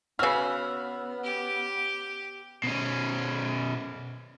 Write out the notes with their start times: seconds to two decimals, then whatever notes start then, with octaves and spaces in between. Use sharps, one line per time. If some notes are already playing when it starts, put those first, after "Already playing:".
0.19 C#3 B3 F#4 B4 E6 F6
1.24 G4
2.64 B2 C#4